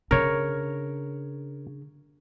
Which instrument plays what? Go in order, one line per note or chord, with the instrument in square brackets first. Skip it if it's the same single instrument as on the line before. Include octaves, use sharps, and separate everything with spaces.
[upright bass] C#3 D4 [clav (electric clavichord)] A#4 C#5